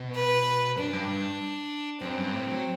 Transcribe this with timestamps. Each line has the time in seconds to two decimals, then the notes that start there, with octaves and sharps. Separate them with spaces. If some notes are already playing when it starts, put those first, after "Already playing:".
Already playing: B2
0.15 B4
0.76 F#2 D4
0.93 G2
1.08 G2
2.01 F#2 C4
2.17 G2
2.33 A2
2.48 F#3